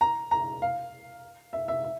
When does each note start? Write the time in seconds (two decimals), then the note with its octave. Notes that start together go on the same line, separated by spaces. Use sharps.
0.01 A#5
0.31 A#5
0.62 F5
1.53 E5
1.68 E5
1.84 E5